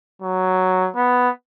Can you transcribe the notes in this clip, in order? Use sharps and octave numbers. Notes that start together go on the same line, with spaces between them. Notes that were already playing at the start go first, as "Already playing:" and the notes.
F#3
B3